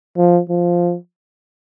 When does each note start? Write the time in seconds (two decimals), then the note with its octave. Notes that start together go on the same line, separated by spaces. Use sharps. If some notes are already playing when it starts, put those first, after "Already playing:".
0.17 F3
0.50 F3